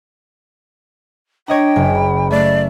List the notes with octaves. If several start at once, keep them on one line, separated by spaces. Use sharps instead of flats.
D4 C#5 D#5 G5 A#5
F#1 G#5
B5
A3 D5